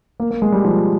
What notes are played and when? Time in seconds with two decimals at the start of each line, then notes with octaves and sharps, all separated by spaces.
0.20 A#3
0.31 A#3
0.42 G#3
0.52 G3
0.65 F3